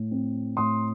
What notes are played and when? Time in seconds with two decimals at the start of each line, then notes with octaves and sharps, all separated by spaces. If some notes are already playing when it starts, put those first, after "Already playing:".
Already playing: A2
0.11 C4
0.57 A2 C6 D#6